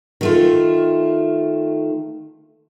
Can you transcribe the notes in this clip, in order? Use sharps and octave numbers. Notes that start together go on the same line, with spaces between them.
D#3 A3 F4